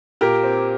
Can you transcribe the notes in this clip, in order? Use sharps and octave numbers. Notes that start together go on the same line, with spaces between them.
A#2 G4 A#4
C4